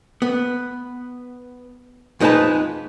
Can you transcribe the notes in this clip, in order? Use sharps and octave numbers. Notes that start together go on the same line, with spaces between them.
B3
F2 G#3 D#4 B4 G#5 A5